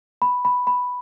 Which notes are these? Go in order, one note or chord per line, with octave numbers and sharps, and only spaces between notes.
B5
B5
B5